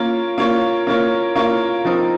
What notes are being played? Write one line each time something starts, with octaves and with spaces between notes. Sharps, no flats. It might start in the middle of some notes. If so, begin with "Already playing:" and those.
Already playing: A#3 C#4 F4 A#4 C#5
A#3 C#4 F4 A#4 C#5
A#3 C#4 F4 A#4 C#5
A#3 C#4 F4 A#4 C#5
F3 C4 D#4 A#4